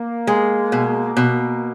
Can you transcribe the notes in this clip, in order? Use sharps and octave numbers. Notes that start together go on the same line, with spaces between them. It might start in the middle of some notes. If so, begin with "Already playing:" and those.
Already playing: A#3
G#3
B2
B2